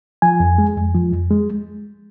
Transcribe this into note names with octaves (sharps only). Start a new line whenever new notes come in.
F3 G#5
F2
G#3
F2
F3
F2
G#3